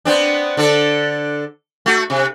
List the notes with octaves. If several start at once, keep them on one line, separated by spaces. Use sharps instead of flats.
B3 C4 D4
D3 D4 A4
A3 F#4
C3